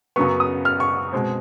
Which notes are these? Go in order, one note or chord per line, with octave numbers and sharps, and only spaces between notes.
F#2 C#3 F#3 B3 C#6
D#6
F6
C#6
B2 G#3 C4